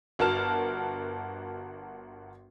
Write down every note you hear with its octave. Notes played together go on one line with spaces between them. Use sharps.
G1 F#4 A#4 A5 F6 E7